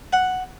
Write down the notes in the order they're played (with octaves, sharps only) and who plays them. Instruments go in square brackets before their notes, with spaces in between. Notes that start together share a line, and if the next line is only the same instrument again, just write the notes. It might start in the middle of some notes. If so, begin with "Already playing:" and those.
[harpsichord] F#5